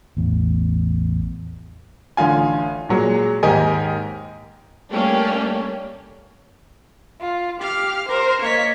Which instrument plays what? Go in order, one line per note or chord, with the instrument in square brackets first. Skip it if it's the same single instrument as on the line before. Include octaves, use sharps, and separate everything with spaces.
[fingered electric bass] A1 E2
[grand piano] A1 D3 F4 G#5
A#2 F#3 G#3
D#2 G#2 G4 A#4 D#5 G#5
[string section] G3 A3 A#3 C#4 D4 G4
[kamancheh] F4
[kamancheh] G4 [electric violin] F5 F6
[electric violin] A#4 [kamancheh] C5
[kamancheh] A#3 D#5 [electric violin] C#5 B6